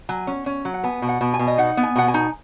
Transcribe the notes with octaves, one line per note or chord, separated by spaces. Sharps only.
F#3 G#5
C#4
C#4
F#3
F#5
B3 G#5
B2
F#5
B2
G#5
B2
D#5
D#4 F#5
B3
G#5
B2 F#5
G#5
D#4